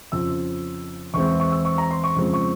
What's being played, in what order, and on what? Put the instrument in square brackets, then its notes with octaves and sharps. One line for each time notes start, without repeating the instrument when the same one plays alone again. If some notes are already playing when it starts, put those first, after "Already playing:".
[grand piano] F2 C#3 F3 E6
E2 E3 G#3 C4 C#6
C#6
C#6
E6
C#6
A#5
C6
C#6
F2 C#3 F3 G#3 C4
C#6